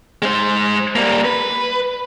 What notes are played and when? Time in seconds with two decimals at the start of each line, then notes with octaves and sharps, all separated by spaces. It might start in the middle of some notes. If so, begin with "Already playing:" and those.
0.22 G#3 C5
0.96 G3 A#3
1.25 B4